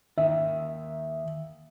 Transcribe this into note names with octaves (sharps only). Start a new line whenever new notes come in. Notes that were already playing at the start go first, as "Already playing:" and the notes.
D#2 D#3 E5